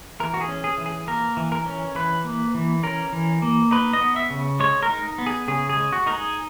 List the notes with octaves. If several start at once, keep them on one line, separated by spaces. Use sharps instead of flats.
E3 A#4
F#4
G#4
C#4
G#4
E3
G#4
A#3 A#4
E3
A#4
C#4
E3 B4
A#3
E3
C#4 A#4
E3
A#3
D#4 B4
D#5
B3
E5
C#3
G#3 C#5
A#4
D#4
B3
G#4
C#3 G#4
G#4
G#3
F#4
D#4 A#4
G#4